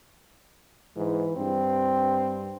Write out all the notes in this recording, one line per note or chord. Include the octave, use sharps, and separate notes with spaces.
G#2 E3
G2 C4